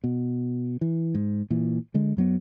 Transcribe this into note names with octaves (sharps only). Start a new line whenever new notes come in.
B2
E3
G#2
A#2 E3
D3 G#3
F#2 F#3 B3